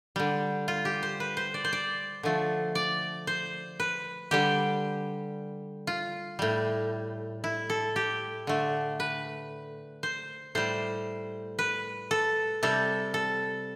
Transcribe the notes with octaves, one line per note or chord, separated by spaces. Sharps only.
D3 G3
F4
G4
C5
B4
C5
D5
C5
D5
D3 F3 A3
D5
C5
B4
D3 G3 G4
F4
A2 G3
E4
A4
G4
D3 A3
B4
C5
A2 G3 C5
B4
A4
C3 G3 A4
A4